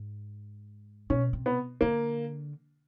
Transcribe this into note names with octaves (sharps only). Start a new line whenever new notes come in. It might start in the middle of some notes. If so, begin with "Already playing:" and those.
Already playing: G#2
B2 C#4
C3
B3
D3 A#3